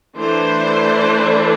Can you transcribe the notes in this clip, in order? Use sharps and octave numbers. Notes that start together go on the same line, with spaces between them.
E3 A3 D4 C5